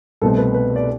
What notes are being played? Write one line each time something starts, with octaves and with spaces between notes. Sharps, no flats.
C2 B2 A3 C4 A4
B4
B4
D5